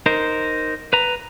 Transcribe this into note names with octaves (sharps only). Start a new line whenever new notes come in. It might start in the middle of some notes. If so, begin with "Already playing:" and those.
D#4 A#4 C5
B4 A#5